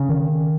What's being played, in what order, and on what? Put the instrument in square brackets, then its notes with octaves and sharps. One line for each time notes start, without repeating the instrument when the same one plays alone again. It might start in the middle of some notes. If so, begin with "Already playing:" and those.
Already playing: [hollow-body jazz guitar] C#3
[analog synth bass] D#3